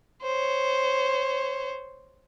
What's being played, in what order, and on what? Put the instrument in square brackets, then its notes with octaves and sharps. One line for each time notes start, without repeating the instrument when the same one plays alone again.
[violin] C5 C#5